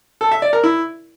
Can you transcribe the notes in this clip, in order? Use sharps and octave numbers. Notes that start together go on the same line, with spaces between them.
A4
E5
D5
A#4
E4